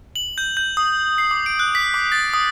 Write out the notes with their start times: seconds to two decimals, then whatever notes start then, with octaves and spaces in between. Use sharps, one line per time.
0.16 F#7
0.38 G6
0.57 G6
0.77 D#6
1.18 C7
1.31 D6
1.46 D7
1.59 F#6
1.75 B6
1.94 D6
2.12 A6
2.34 D#6